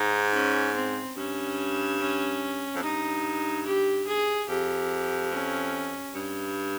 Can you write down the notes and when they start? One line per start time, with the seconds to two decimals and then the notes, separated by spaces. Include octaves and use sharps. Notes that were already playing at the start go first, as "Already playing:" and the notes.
Already playing: G#2 D#4
0.34 C#4
0.75 C4
1.17 G2 C#4
2.00 C#4
2.75 F2
2.83 G2 D#4
3.66 G4
4.07 G#4
4.49 F2 G4
5.32 C#4
6.14 G2